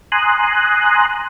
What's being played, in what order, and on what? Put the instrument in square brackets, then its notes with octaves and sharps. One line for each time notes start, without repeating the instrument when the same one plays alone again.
[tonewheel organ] G#5 A#5 C6 D#6 F#6